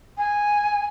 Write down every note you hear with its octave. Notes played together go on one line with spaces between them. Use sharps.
G#5